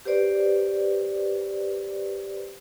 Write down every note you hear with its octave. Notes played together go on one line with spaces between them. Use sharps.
G4 B4 C5 D5